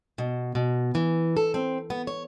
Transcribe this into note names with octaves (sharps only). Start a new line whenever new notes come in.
B2
B2
E3
A4
C4
B3
C#5